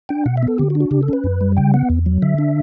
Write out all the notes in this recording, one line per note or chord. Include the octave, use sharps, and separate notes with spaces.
D4 G5
B2 F#5
E5
B3
A4
D3 G4
F#4
D4
F#4
C#3 G4
A4
C#4 B4
F#2
G3
C#3 G5
B3 F#5
E2
F#3
D3 E5
D4